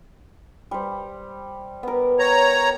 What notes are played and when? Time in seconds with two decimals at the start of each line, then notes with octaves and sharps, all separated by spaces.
0.71 G3 C5
1.83 B3 A#4
2.19 C#5 A#5